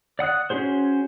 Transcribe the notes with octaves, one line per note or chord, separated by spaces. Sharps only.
D5 F#5 D#6 F#6
C#4 E4 F#4 G#4 C5